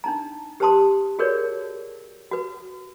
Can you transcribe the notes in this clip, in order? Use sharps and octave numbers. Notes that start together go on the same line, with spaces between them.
D4 D#4 A#5
G4 B4 C5 A5 C6 D#6
F#4 G#4 A#4 B4 C#5 D5
F#4 B4